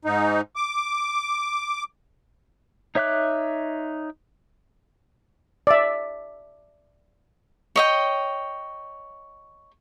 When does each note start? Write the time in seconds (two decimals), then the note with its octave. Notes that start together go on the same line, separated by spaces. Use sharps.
0.05 G#2 D#4
0.56 D6
2.95 D#4 C#5 E5 D6 F#6
5.67 D5 E5
7.76 C#5 D#5 G5